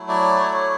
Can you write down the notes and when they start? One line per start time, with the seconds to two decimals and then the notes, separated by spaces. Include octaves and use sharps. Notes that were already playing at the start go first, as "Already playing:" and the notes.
Already playing: F#3 A3 E4
0.09 D5
0.40 C#5